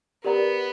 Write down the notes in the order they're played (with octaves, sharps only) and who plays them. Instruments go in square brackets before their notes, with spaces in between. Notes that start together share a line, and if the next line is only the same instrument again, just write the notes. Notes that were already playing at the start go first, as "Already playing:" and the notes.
[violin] B3 [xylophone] G4 A#4 D5 F#5 A#5